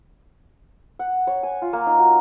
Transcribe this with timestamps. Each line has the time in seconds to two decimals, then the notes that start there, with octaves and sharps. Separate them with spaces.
0.99 F#5
1.27 C#5
1.43 G#5
1.62 F4
1.73 A#3
1.86 D#4
1.99 F#4